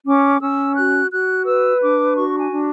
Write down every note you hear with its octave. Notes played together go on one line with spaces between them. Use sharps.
C#4 D6
C#4 E6
F#4 F#6
F#4 F#6
B4 E6
D4 D6
F#4 C#6
G#5
D4